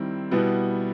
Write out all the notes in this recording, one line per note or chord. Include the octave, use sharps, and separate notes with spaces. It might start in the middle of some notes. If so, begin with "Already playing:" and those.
Already playing: D#3 G3 C4 E4
B2 G3 B3 E4